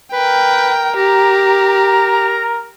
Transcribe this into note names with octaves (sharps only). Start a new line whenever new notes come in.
A#4 B4 G5
G4 A#5